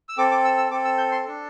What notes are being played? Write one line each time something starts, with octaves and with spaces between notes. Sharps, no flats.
E6
C4 A4 D6
D6
E6
E6
C4 A4 D6
E6
G6
C6
D4 A4